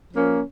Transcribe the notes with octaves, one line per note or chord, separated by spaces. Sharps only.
F3 A#3 C#4